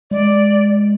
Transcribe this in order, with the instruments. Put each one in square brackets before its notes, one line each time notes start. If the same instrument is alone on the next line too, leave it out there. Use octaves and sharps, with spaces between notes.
[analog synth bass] G#3 [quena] D5